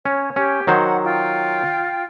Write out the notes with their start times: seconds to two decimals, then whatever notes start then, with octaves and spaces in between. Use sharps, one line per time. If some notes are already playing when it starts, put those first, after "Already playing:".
0.05 C#4 C#5
0.36 C#4 G4 C#5
0.67 D#3 F#3 C5 F#5
1.03 F4 G5